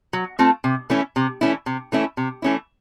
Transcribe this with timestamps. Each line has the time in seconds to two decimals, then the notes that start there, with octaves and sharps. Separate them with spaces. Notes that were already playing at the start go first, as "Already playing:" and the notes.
0.13 F#3
0.39 A3 C4 F4
0.64 C3
0.90 E3 A3 C#4 E4
1.16 C3
1.41 E3 A3 C#4 E4
1.66 C3
1.92 E3 A3 C#4 E4
2.17 C3
2.42 E3 A3 C#4 E4